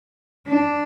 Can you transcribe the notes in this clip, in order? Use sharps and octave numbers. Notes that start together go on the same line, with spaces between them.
D4